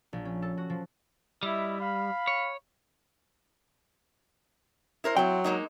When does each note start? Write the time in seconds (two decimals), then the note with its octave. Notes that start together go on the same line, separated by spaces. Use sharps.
0.13 A#1
0.25 C#4
0.42 A4
0.58 F#4
0.70 F3
1.43 G3 E4 D#5 E5
1.80 F5 B5
2.27 C#5
5.04 E4 A#4 C5
5.17 F#3 C4 E4 G5
5.44 G#3 A#3 D#4